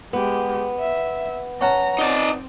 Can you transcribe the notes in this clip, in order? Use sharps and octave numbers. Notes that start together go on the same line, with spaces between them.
G#3 B3 G4
E5
C#4 F#5 A5 A#5
C4 D#4 D5